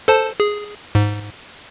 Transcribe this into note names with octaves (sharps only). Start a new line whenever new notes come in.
A4 C5 A5
G#4
G#2